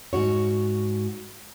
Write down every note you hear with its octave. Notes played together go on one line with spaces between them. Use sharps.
G#2 F#4 C#5